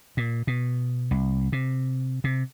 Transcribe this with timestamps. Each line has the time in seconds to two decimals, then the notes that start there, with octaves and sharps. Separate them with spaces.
0.17 A#2
0.47 B2
1.11 C2
1.52 C3
2.24 C3